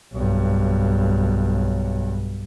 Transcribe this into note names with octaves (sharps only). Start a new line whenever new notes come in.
B1 G2